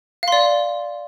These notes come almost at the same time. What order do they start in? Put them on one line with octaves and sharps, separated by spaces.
F5 C6 D5